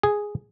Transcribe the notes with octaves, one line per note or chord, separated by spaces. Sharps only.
G#4